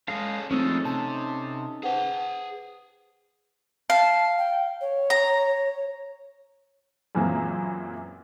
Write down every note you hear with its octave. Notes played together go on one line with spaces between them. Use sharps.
G#3 C#4 A4 F5
F3 G#3 A3 C4 C#4 D#4 A4
C3 A5
G#4 B4 C5 F#5 G5
F5 A5
G5
C#5
A#5
F#2 A#2 E3 G#3 A#3 C4